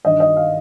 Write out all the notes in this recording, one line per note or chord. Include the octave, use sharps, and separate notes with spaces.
G2 D#3 D#5
D#5
F5